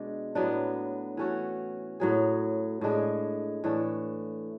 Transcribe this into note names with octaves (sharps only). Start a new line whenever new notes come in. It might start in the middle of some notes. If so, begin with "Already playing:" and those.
Already playing: B2 G#3 D4
A2 F#3 B3 D4
E3 A3 C#4 F#4
A2 F#3 C#4 G#4
A2 G#3 D4 G#4
A2 E3 A3 D4